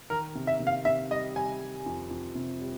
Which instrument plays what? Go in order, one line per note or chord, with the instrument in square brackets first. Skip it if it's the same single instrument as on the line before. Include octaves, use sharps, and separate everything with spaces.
[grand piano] D#3 [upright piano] A#4
[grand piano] C3
[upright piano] E5
[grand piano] C3
[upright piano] F5
[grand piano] C3 [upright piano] E5
[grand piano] G3 [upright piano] D#5
[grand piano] G3 [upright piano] G#5
[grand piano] G3
F2
F2
C3
G3